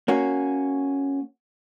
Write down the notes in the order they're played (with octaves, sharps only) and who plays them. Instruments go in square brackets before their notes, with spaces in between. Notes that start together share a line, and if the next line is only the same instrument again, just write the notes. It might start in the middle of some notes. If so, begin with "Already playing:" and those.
[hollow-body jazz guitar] A#3 C#4 F#4